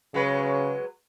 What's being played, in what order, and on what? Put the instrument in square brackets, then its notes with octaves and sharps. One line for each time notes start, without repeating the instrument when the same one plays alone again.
[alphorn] C#3 [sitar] F#3 G#3 B4